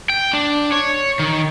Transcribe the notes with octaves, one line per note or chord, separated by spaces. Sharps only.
G5
D4
C#5
D#3